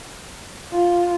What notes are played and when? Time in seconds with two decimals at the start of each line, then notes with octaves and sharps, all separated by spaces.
0.72 F4